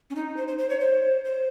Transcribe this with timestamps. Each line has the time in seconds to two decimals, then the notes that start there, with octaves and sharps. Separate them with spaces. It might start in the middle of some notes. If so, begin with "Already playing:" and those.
0.10 C#4
0.15 D#4
0.37 C5
0.48 C5
0.58 C5
0.70 C#5
0.80 C5
1.25 C5